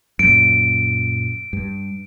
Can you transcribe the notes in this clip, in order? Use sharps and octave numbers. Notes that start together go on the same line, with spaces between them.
F#2 A#2 D7
G2